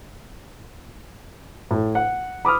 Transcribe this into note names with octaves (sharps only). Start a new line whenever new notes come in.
A2
F#5
B5 D6 D#6 F6